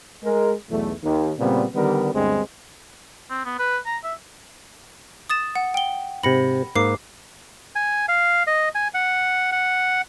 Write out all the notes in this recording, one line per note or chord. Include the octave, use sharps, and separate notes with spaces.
G#3 A#4
B1 E2 A3
D#2
A#2 C#3 G3 B3 C4
D3 D#3 G3 B3 G4 A#4
D2 G2 G3 G#3 B3 C4
C4
B3
B4
A#5
E5
D#6 A6 E7
F#5
G5 G7
G#2 C3 B5 A#6 C#7
G#2 A#3 D6 C7
G#5
F5
D#5
G#5
F#5
F#5